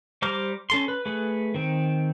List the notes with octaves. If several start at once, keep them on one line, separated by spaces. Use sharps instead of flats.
G3 C5 A#5 D6 F6
C#4 A4 C6
B4
A3 G#4 B4
D#3 C4